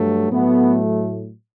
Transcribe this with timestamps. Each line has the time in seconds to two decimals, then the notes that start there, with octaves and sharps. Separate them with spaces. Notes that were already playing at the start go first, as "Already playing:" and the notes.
Already playing: G2 F#3 A3
0.31 A2 F#3 A3 B3